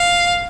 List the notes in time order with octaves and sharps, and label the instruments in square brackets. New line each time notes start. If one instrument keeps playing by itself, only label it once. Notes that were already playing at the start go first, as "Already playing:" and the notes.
Already playing: [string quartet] F5